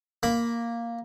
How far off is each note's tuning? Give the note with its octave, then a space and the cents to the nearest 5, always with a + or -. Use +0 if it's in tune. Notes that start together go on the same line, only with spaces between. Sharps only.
A#3 +0 B5 +0